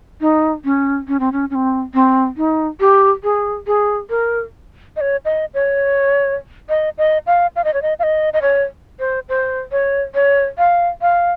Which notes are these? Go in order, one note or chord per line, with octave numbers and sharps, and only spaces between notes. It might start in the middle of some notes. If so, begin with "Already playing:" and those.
D#4
C#4
C#4
C4
C#4
C#4
C4
C4
D#4
G4
G#4
G#4
A#4
D#5
C#5
D#5
C#5
D#5
D#5
F5
F5
D#5
C#5
D#5
F5
D#5
D#5
C#5
C5
C5
C#5
C#5
F5
F5